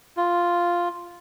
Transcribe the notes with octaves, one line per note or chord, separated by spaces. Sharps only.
F4